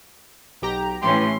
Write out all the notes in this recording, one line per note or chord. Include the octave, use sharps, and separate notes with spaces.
B1 G4 A#5
A2 E3 C#4 G4 C6